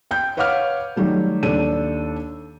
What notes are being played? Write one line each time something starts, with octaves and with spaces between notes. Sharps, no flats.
G5 G6
B4 C#5 F5 F#5 D6 F6
D#3 F#3 G3 A3
D#2 D4 A4 D#7